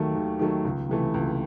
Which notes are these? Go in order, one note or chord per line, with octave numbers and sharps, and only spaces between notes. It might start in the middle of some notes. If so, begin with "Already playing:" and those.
Already playing: D#2 D#3 F#3 A3
D#2
D#3 F#3 A3
C#2
C3 E3 A3
C#2